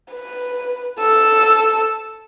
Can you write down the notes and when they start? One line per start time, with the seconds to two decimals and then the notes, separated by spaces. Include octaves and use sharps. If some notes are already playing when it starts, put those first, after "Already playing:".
0.12 B4
0.99 A4 E6